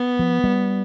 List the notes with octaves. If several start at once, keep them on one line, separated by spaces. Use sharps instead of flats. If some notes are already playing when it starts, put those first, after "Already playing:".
Already playing: B3
F3
G3